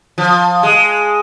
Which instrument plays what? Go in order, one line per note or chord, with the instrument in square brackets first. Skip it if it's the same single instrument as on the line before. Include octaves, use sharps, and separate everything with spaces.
[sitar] F3
G#3